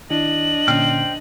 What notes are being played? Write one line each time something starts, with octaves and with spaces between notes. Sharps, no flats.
D#3 D4 E4 D#5 F#7
A#2 D3 C#4 C5 G5 F6